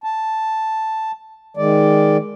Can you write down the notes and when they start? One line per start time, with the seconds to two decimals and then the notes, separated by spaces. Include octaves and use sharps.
0.04 A5
1.57 D#3 G#3 D5